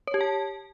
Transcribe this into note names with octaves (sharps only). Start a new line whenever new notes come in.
C#5
G4
A5